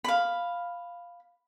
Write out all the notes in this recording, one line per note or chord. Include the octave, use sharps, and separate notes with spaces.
F5 B5